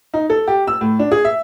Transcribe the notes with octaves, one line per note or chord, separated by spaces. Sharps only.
D#4
A4
G4
E6
A2
D4
G#4
E5